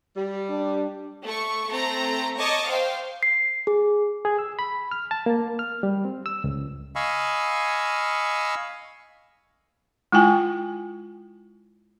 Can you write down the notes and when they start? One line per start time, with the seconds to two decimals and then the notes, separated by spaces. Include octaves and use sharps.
0.16 G3
0.49 D4
1.23 A3 C#6
1.70 A3 C4 A#5
2.38 C#5 D#5 A5 C#6 D6
2.67 C5 F5 G5
3.23 C7
3.67 G#4
4.25 G#4
4.39 E6
4.59 B5
4.91 F6
5.11 A5
5.26 A#3
5.59 F6
5.83 G3
6.05 C4
6.26 E6
6.44 C#2
6.96 D#5 F5 G#5 B5 C#6 E6
10.12 G#3 E4 F4 G5 G#5